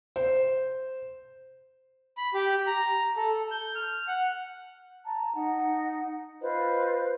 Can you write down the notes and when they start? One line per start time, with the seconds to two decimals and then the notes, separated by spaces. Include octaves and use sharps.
0.16 C5
2.17 B5
2.34 G4
2.67 A#5
3.16 A4
3.51 G6
3.75 F6
4.08 F#5
5.05 A5 A#5
5.34 D#4 F#5
6.42 F4 B4 C5 D#5